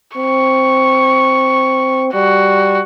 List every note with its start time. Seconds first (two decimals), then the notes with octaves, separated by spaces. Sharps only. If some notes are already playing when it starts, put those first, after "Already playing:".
0.17 C4 C#6
2.14 G3 F#4